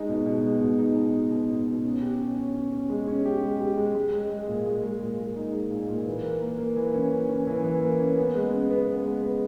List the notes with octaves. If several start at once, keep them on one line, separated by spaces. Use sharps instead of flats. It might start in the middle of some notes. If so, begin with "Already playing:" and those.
Already playing: G#3 D#4
B2
B2
G#3
B2
D#4
B2
B2
B2
B2
B2
C#4
G4
C#4
C#4
C#4
C#4
G#3
C#4
G4
G#3
G4
G#3
G#3
G#3
G#3
A#2
G#3
G#3
A#2
G#3
D#4
G#3
A#2
A#2
E3
A#3
A#3
A#3
E3
C#4
E3
C#4
E3
E3
A#3
C#4
B3
G#3
C#3
B3
B3
G#3
B3